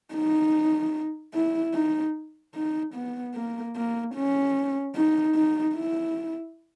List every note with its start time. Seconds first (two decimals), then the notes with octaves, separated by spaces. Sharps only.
0.14 D#4
1.34 E4
1.74 D#4
2.55 D#4
2.94 B3
3.34 A#3
3.76 A#3
4.15 C#4
4.95 D#4
5.35 D#4
5.76 E4